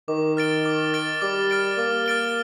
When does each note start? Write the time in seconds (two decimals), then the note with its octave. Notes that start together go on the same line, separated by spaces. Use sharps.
0.08 D#3 D6
0.37 F6 A6 D7 G7
0.65 D6
0.93 F6 A6 D7 G7
1.22 G3 D6
1.50 F6 A6 D7 G7
1.78 A#3 D6
2.06 F6 A6 D7 G7